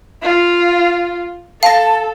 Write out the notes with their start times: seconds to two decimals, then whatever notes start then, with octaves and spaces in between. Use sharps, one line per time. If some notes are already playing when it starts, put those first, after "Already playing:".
0.23 F4
1.63 A4 F5 A5 A#6